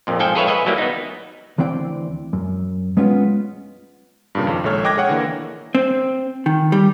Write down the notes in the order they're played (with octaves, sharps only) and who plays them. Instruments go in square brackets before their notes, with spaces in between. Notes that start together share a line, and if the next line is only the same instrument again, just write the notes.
[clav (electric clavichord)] A#1 F2 A#2
G#2 F3 A4 G5 G#5
G#4 A4 B4 C#5 E5 F5
A4 B4 D#5 E5 G#5
F#3 G3 A#3 E4
B3 D#4
[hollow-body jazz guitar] D2 E3 C4 D5 G5
F#2
G#3 B3 C#4 D4 F4
[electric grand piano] G2 A#2 C#3
F2 D#3
A#1 G#3 A4 C#5 F6
D#5 G5 D6 F#6 G#6 A#6
G#4 C#5 F#5 G5
D3 E3 A#3
[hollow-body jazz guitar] C4
D#3
G3